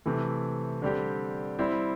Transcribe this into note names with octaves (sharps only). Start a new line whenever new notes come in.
C3 E3 A3
D3 G3 C4 G4
G3 C4 E4